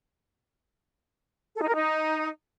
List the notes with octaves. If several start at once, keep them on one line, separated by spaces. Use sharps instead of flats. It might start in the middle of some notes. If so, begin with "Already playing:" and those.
A4
D#4
A#4
D#4